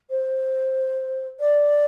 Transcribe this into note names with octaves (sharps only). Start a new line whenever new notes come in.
C5
D5